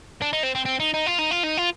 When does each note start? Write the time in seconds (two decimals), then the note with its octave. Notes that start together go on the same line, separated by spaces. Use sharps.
0.22 D4
0.33 D#4
0.43 C4
0.55 C4
0.65 C4
0.80 D#4
0.94 D#4
1.06 F4
1.19 D#4
1.31 F4
1.44 D#4
1.58 F4